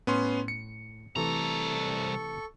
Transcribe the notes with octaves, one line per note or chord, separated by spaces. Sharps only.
A2 B3 C#4 C6
C#7
C2 C3 E3 A3 A4 A#5 C#6